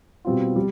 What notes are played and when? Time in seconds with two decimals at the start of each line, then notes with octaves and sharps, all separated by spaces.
0.25 B2 G3 C4 F4
0.56 G3